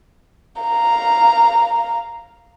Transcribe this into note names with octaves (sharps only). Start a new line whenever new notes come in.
F5 A#5